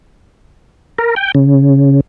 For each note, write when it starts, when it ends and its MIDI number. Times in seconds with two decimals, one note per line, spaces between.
0.98 1.15 70
1.16 1.32 79
1.35 2.00 49